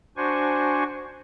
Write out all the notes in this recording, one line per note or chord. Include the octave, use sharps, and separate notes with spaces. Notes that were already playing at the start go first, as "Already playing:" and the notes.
D4 F#4 C5 G#5 C#6